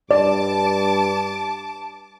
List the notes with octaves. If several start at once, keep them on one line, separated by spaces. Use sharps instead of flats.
G2 D5 A5 D6